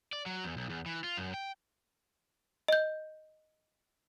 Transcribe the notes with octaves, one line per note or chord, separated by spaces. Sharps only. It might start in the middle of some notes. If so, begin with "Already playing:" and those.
D5
F#3
E2
B1
E2
E3
F4
F#2
G5
D#5 G6